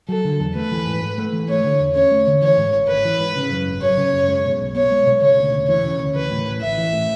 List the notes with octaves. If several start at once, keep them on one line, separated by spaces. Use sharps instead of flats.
F#3 A4
D3
E2
A3 B4
E3
G#2
G#2
A3
E3
A3 C#5
D3
E2
C#4 C#5
A3
D3
E3 C#5
G#2
G#1
G#1 B4
E3
G#2
C#3
F#2
G#1
F#3 C#5
C#3
F#2
G#3
B2
B1
B3 C#5
G#3
B2
C#3 C#5
D2
E1
E3 C#5
C#3
D2
E3 B4
A2
A1
A1 E5
E3
A2